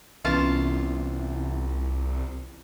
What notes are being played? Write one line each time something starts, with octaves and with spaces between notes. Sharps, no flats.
C2 E3 B3 C#4 F4 A5